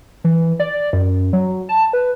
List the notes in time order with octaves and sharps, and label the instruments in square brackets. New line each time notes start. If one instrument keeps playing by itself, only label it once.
[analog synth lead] E3
D5
F#2
F#3
A5
B4